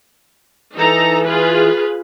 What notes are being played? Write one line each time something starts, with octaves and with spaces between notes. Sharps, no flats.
E3 D#4 A4 A#5
F4 G#4 B4